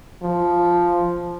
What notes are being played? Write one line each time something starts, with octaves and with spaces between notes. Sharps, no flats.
F3